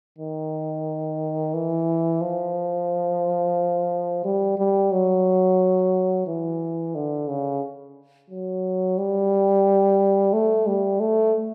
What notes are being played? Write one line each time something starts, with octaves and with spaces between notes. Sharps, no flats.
D#3
E3
F3
G3
G3
F#3
E3
D3
C#3
F#3
G3
A3
G3
A3